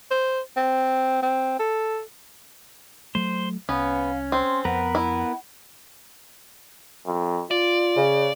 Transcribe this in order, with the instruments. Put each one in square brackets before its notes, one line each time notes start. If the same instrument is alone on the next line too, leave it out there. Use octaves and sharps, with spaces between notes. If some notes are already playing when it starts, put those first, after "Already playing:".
[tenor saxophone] C5
C4
C4
A4
[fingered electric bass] F#3 A3 [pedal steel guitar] C5
[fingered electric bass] C2 [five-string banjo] B3 [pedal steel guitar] C#4 [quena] F5
[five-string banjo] C4 [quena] C6
[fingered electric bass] F2 [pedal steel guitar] B3 A#4 B4 [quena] F#5
[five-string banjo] E4
[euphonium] F2
[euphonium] F4 [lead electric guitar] D5
[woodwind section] C#3